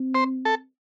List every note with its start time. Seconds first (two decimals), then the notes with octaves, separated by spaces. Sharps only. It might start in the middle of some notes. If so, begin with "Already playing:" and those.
Already playing: C4
0.15 C5
0.45 A4